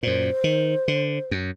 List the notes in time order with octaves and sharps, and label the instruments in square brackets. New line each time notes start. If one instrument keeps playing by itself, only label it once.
[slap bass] F#2 A#2 [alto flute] C5
[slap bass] D#3
D3
F#2